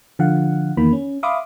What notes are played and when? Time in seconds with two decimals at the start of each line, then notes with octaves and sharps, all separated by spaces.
0.19 D3 F3 F5 F#5
0.77 E2 D#3 A#3 B5
0.93 C#4
1.23 E5 F5 B5 C6 D6 D#6